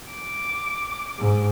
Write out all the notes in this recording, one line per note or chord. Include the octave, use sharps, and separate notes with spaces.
D6
G#2